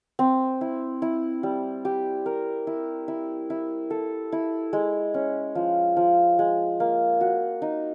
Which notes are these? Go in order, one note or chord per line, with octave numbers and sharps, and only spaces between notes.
C4
E4
E4
G3
G4
A#4
E4
E4
E4
A4
E4
G#3
C#4
F3
F3
G#3
A#3
F#4
D#4